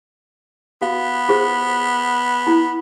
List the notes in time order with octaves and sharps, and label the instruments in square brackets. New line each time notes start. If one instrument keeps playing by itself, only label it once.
[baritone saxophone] B3 [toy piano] F#4 F5
[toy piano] F4 G#4 C5
E4